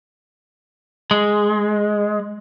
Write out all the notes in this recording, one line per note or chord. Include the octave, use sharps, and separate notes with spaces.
G#3